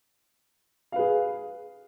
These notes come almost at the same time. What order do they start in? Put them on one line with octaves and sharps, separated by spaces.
F5 B4 G#4